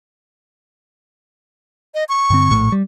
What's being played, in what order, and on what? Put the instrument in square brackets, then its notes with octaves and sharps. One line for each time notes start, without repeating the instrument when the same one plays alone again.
[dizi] D#5
C#6
[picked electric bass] G2 D3 C4
A#1 A2
G3